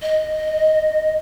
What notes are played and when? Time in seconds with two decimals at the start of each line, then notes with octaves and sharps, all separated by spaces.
0.02 D#5